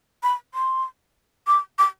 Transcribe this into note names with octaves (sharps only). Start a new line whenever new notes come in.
B5
C6
D6
D6